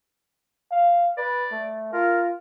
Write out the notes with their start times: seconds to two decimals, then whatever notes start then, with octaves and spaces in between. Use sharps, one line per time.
0.71 F5
1.18 B4 D5
1.51 A3
1.93 F4 A#4